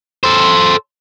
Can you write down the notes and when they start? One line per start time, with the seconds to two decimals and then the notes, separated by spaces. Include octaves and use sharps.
0.24 A4 C5